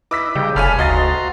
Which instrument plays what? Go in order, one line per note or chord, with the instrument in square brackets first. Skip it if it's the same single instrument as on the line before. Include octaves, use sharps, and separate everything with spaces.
[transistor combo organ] E4 B4 D#5 [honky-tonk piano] D6 E6 B6
[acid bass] C#3 [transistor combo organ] G3 D#5 G5
[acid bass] F1 [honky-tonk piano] A4 C#5 G#5 [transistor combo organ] F5 B5 F6
[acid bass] D2 [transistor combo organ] F#4 A#5 C6 [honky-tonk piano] D#5 F5 A6